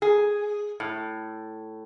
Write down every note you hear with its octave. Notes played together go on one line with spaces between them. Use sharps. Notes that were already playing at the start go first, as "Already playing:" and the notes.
G#4
A2